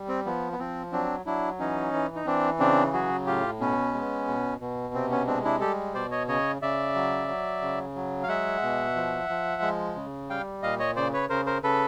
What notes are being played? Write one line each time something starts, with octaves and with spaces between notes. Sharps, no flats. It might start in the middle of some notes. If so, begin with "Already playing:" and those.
Already playing: G3
C4
F3 B3
B3
F3 C4
F#3 C4 D4
F#3 D4 E4
E3 C#4 D#4
E3
D#4
E3 C4 D4
C#3 C4 D4
F#3 F#4 G#4
A2 F4 G4
B2 B3 C#4
G#3
B2
B2
C3 C4
B3 C#4
G#3 C4 D4
D4 E4
G3 G4 A4
B2 C5 D5
C#5 D#5
C#3 C#5 D#5
C#3 D5 E5
F#3
F#3
C#3
F#3
F5
G#3 E5 F#5
B2
F3
F3
G#3
C#3
G3 F5 G5
A#2 D#5 F5
C#5 D#5
C#3 C5 D5
B4 C#5
C#3 A#4 C5
A#4 C5
C#3 A4 B4